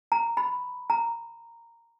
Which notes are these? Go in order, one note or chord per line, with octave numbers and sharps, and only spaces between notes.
A#5
B5
A#5